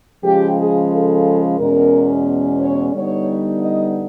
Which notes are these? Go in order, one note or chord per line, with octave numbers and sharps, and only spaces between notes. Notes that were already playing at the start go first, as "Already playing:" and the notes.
C#3 F3 G#3 G4
G#4
A4
E2 B2 G#3 C#4 A#4
C#5
D3 G3 B3 D#4 C#5
D#5